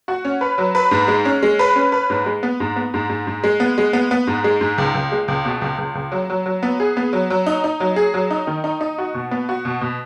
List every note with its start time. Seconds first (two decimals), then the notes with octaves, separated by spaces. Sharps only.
0.08 F#4
0.25 C#4
0.41 B4
0.58 F#3
0.75 B4
0.91 G#2
1.08 G#3
1.25 C#4
1.43 G#3
1.59 B4
1.76 C#4
1.92 B4
2.10 G#2
2.26 G#3
2.43 B3
2.60 G#2
2.76 B3
2.94 G#2
3.09 G#2
3.27 G#2
3.44 G#3
3.60 B3
3.78 G#3
3.93 B3
4.11 B3
4.27 G#2
4.44 G#3
4.61 G#2
4.78 C#2
4.95 C#2
5.12 G#3
5.28 C#2
5.45 B2
5.62 C#2
5.78 C#2
5.95 C#2
6.12 F#3
6.30 F#3
6.46 F#3
6.63 B3
6.80 G#4
6.97 B3
7.13 F#3
7.30 F#3
7.46 D#4
7.64 D#4
7.80 F#3
7.96 G#4
8.14 F#3
8.31 D#4
8.47 D#3
8.64 D#4
8.81 D#4
8.98 F#4
9.14 B2
9.31 B3
9.49 F#4
9.65 B2
9.81 B2